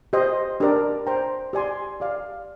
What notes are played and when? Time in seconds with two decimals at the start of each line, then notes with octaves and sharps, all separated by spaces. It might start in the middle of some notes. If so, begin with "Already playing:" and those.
0.13 G4 C5 D#5
0.60 D4 G4 A#4 D5
1.07 C5 G5 A#5
1.53 G4 D5 G#5 C6
2.00 G4 D5 F5